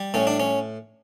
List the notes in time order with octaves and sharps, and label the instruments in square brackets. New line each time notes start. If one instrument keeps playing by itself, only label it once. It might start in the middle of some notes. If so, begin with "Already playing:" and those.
Already playing: [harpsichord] G3
A2 C#4
D4
C#4